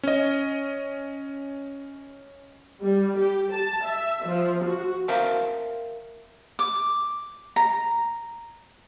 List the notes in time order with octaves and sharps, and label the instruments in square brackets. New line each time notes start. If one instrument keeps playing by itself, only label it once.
[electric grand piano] C#4 D#5
[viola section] G3
G4
A5
E5
F3
F#4
[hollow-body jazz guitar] A#4 C5 E5 F5 G5 A5
[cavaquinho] D6
A#5